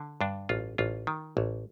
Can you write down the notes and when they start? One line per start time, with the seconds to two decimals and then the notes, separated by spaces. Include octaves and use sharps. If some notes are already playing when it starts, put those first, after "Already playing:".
Already playing: D3
0.21 G2 D4
0.49 A1 F4
0.78 A1 F4
1.07 D#3
1.37 A1